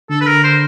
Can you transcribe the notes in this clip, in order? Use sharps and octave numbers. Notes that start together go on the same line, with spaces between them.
D3 A4
B4
A#4
C5